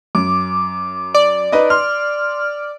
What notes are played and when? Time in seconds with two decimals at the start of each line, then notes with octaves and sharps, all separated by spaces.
0.15 F#2 D6
1.14 D5
1.52 D#4 B4 D#5
1.70 C6 F6